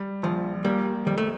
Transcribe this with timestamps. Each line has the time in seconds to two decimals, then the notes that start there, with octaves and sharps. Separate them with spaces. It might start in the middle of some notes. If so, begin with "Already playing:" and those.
Already playing: G3
0.23 A#1 F3
0.65 G3 A#3
1.06 F2 G3
1.18 A3